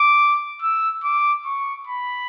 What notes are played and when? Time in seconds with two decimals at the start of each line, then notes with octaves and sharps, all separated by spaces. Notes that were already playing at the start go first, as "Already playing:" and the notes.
Already playing: D6
0.62 E6
1.04 D6
1.45 C#6
1.87 B5